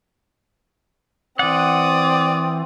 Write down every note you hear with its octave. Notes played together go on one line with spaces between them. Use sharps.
E3 C4 D5 F#5 D#6